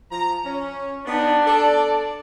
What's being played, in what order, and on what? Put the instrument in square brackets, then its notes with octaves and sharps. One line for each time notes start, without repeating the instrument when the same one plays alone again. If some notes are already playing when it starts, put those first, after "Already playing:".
[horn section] F3 A#5
C#4
[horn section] B3 D#4 G4 [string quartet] D4
[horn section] A4 D5